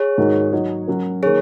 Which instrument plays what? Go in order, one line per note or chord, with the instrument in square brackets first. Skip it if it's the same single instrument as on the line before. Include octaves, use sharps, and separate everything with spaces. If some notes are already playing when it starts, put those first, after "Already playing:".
Already playing: [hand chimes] G#4 C#5
[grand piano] G#2 D#3 G#3 F#4 A#4
F#3 D#4 F#4 C#5
F#3 C#4 F#4 A#4
[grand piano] D#3 A#3 [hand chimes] G#4 C#5